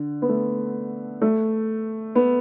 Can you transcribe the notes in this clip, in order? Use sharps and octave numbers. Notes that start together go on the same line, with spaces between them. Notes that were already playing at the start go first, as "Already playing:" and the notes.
Already playing: D3
B3
A3
A3
B3